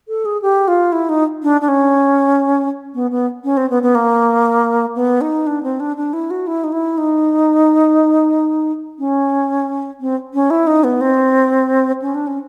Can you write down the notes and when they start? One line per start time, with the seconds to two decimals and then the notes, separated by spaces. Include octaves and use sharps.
0.08 A4
0.25 G#4
0.42 G4
0.68 F4
0.92 E4
1.09 D#4
1.43 D4
1.61 D4
1.68 C#4
2.94 B3
3.11 B3
3.44 C#4
3.57 C4
3.70 B3
3.83 B3
3.95 A#3
4.96 B3
5.21 D#4
5.47 D4
5.63 C4
5.80 D4
5.97 D4
6.13 E4
6.30 F#4
6.47 E4
6.64 D#4
6.72 E4
6.98 D#4
8.99 C#4
10.00 C4
10.34 C#4
10.50 E4
10.67 D#4
10.84 B3
11.01 C4
12.02 C#4
12.14 D4
12.27 C#4